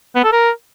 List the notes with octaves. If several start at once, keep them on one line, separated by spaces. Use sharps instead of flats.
B3
A4
A#4